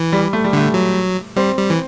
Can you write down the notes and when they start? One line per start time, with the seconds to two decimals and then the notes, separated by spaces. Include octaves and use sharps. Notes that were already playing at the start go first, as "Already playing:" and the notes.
Already playing: E3
0.12 G3
0.33 A3
0.44 G3
0.53 D3 A3
0.74 F#3
1.36 G3 C4
1.57 G3
1.70 E3